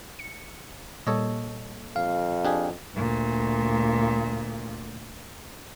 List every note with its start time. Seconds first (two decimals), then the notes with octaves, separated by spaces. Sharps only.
0.19 C#7
1.07 A#2 G3 A#3 A4 C#5 D#5
1.96 F2 F5
2.45 D4 G4 G#4
2.95 D2 A#2